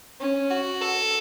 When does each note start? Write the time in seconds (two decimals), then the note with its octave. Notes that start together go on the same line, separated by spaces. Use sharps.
0.21 C#4
0.50 F#4
0.81 A4